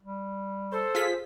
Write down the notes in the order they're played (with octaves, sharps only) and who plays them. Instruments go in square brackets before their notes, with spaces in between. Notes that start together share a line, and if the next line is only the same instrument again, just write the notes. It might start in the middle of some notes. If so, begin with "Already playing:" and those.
[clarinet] G3
[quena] A4 [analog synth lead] C5
[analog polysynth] F4 G#4 B6